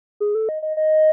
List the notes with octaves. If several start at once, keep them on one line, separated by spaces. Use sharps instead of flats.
G#4
A4
D#5
D#5
D#5